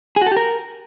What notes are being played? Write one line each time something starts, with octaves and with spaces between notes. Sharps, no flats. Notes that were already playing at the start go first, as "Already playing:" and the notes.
G#4
F#4
A4
G4
A#4